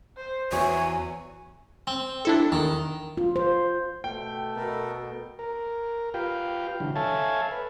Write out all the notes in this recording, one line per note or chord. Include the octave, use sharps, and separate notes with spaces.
C5
E2 E3 C#4 F#4 C#5 G#5
C4
D4 E4 A4
E2 D#3
F4
C5
B2 A3 G5
B2 A4 A#4
A#4
F4 G4 B4 F5 G5
D3 E3 F#3
A4 C#5 E5 F5 G#5 A5
B4